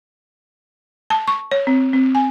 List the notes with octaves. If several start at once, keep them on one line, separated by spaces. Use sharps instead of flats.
A5
C#6
C#5
C4
C4
G#5